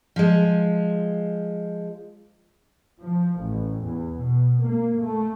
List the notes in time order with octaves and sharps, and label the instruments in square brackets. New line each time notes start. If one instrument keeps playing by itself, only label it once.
[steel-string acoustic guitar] F3 G#3
[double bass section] F3
A1
E2
B2
A#3
A3